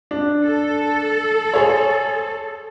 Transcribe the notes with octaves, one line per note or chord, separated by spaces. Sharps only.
D4
A4
G#4 C5 C#5